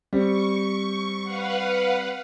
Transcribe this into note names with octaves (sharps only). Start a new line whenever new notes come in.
G3 C4 C#6
B4 F5 F#5